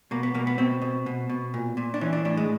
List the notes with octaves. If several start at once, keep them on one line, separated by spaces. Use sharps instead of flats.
B2 A#3
B3
B2 A#3
B3
B2 C4
B2
B2
B2
A#2
A#2
D4
E3 C#4
D4
A2 D4
G#3